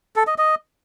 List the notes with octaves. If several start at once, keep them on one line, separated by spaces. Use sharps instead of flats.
A4
D#5
D#5